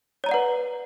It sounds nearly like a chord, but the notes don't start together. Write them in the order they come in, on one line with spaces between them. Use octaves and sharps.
C#5 A#5 D5 F#5 B4